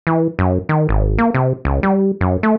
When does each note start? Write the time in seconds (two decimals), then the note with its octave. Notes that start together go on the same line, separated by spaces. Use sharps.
0.07 E3
0.39 F#2
0.69 D#3
0.89 G#1
1.18 A#3
1.34 C3
1.65 C#2
1.83 G3
2.21 F#2
2.43 A3